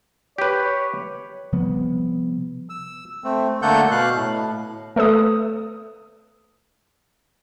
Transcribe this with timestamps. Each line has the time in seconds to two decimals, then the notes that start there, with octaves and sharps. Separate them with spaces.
0.38 G4 B4 C#5
1.53 C3 F3 G3 B3
2.70 E6
3.24 A3 C4
3.62 D3 A3 A#3 A4 F#5 G6
3.91 B2 F5 F#6
4.16 A2
4.96 A3 A4 B4 D#6